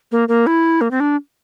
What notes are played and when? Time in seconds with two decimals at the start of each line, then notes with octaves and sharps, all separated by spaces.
0.12 A#3
0.29 A#3
0.47 E4
0.81 A#3
0.91 C4
1.00 D4